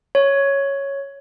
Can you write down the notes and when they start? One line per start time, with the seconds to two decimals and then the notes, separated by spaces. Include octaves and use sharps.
0.15 C#5